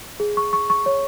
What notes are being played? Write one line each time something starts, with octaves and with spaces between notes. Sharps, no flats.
G#4
C#6
C#6
C#6
C#5